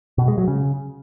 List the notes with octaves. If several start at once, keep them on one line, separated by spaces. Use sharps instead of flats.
B2
G#3
F#3
C#3